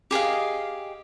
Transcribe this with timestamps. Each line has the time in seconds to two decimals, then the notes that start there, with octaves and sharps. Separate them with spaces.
0.11 G4 G#4 D#5 F5